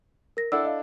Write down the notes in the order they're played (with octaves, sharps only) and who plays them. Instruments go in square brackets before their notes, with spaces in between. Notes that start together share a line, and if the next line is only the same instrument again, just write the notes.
[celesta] A#4 A#6
[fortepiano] D4 E4 A4 [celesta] F#5 E6
[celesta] D#5 F5